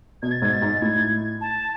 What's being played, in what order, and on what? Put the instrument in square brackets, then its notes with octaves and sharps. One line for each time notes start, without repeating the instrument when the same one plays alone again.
[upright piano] B2 [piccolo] G#6
[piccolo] A6
[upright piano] G#2 [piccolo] G#6
[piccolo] A6
[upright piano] G#2
[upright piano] A2 [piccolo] G#6
[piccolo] A5